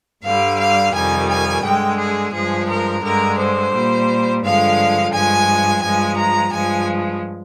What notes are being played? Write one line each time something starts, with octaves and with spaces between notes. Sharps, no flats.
G2 D3 G3 F5
F5
F2 C3 D#3 G3 G#5
G#5
G2 D3 G#3 G5
G#4
G2 F3 G#3 G#4
A#4
G2 D3 G#3 A#4
C5
A#2 G3
G2 D3 F3 G#3 F5
G2 F3 G#3 G#5
G2 F3 G#3 G#5
A#5
G2 F3 G#3 G#5